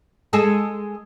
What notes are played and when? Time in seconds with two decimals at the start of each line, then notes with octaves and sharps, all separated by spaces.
0.33 G#3 G#4 A4